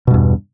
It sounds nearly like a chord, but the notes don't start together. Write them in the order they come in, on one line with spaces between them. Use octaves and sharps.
B2 G2 E2